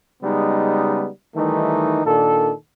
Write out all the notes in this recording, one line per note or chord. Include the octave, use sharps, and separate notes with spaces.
C#3 G3 G#3 B3 D#4
D#3 E3 G3 A3 D#4
A#2 D#3 D4 A4